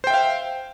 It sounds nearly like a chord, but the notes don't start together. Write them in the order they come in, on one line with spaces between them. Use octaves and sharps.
C5 G5 E5 F5